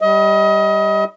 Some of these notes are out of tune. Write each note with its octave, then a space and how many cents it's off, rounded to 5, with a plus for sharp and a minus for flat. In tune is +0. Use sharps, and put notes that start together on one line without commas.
G3 +0 D#5 +30